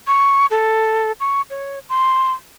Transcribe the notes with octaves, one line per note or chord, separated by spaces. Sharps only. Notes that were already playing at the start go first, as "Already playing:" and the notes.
C#6
A4
C#6
C#5
C6